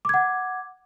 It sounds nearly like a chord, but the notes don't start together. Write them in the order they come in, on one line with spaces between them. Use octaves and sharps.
D6 G#6 F#5